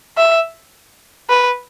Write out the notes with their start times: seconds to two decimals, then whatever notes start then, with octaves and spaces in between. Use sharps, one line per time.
0.18 E5
1.30 B4